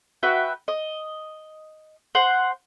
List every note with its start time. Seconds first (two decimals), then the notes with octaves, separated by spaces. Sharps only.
0.23 F#4 B4 E5 G5
0.68 D#5
2.15 C5 F#5